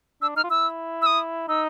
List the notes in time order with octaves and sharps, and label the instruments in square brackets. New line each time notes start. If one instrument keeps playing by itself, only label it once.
[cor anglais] D4 [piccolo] E6
[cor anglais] D#4 [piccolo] F6
[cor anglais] F4
[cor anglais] E4 [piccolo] E6
[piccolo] E6
D#6
[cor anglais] D#4 [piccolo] E6